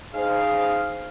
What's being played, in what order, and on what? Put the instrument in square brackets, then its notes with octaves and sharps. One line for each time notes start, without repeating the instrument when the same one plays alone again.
[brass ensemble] D#4 G#4 C5 F5